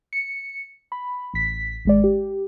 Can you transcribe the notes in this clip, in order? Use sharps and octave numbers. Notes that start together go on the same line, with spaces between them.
C#7
B5
A1 B6
G#1 G#3 D5
G4